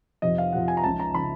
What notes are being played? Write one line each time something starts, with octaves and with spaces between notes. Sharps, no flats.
F2 C3 F3 D#5
F5
F2 C3 F3 F#5
G#5
A#5
C#2 C#3 F3 A5
A#5
C#3 F3 B5